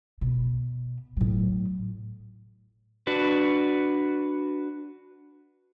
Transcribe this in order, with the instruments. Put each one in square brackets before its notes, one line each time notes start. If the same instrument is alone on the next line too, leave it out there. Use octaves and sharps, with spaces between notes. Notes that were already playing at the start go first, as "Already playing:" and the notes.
[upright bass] B2
A2 F#3
[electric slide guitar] D4 F#4 B4